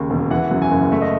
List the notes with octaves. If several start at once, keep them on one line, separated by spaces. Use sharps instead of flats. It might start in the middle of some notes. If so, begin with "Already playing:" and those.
Already playing: D#2 C#3
E1
E3 F#5
F#2
G#5
F#1
A3 E5
D#5